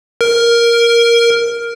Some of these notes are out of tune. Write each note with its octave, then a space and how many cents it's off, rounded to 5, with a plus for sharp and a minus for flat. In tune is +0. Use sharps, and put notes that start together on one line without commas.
A#4 +5